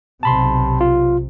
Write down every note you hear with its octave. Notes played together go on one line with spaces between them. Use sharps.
B1 C3 A5 B5 C6
F4